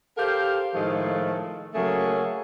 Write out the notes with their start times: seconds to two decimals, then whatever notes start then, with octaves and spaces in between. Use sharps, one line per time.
0.17 G4 A4 A#4 C5 F5
0.74 A2 D#3 F3 G#3 A3
1.74 C#3 F#3 A3 A#3 G#4